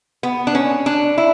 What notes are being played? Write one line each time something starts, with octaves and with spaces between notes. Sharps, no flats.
B3
D4
C#4
D4
E4